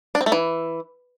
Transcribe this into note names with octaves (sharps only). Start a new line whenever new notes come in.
D4
C4
A3
E3